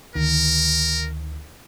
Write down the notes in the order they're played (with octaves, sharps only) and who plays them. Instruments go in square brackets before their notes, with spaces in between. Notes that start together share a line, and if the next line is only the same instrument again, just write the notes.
[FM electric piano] D2 D#3 [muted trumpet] A#4